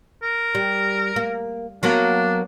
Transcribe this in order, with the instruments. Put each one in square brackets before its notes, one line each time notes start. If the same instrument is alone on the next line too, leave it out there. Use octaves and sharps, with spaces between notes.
[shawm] A#4
[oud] G3
A#3
[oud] F#3 A#3 B3 [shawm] D4